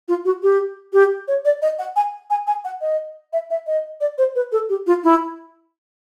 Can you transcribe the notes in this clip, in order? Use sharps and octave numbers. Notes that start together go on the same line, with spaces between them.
F4
F#4
G4
G4
C#5
D5
D#5
F#5
G#5
G#5
G#5
F#5
D#5
E5
E5
D#5
D5
C5
B4
A4
G4
F4
E4